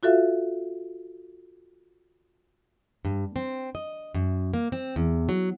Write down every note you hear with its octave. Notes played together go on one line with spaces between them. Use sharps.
F4 F#4 A4 E5 F5
G2
C4
D#5
F#2
A#3
C4
E2
F#3